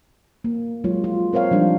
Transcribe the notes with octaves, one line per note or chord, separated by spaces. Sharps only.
A#3
F#3 G#3 F4 C#5
F4
C4 A#4 C5 C#5 F5
F3 G3 D4 D#4 F4